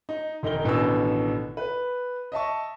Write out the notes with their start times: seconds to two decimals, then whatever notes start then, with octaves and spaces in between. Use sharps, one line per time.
0.09 D#4
0.43 E1 D#4 A#4 G7
0.64 A1 B2 D3 D#3 G#5 E6
1.57 B4
2.32 D#5 E5 A5 C#6